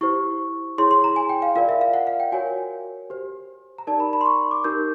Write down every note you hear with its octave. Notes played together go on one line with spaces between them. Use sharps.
E4 G4 C5 C#6
E4 G#4 C#5 C6
C6
A#5
G#5
G5
F5
F4 A#4 D5 F5
E5
F5
F#5
F5
G5
F#4 A#4 C#5 G#5
G4 C5
A#5
D#4 G4 A#4 D5 A5
B5
B5
C6
C#6
D6
D#4 G4 A#4 G6